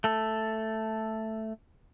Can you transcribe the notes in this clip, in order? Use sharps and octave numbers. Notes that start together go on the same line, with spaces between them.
A3 A4